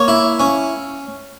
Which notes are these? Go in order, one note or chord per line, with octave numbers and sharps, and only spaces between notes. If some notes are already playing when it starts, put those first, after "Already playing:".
Already playing: A#3 C#5
E4
C#4